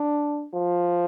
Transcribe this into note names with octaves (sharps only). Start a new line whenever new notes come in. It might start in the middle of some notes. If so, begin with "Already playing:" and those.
Already playing: D4
F3